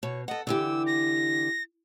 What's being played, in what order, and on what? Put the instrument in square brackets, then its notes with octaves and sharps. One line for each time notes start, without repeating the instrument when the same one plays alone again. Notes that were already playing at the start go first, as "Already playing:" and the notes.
[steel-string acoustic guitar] B2 [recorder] C#5
[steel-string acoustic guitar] A4 F#5 [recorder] D#5
[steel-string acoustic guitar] D3 E3 G4 [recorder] E6
[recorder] A#6